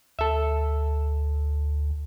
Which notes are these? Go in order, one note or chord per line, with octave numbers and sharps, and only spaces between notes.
D2 A4 E5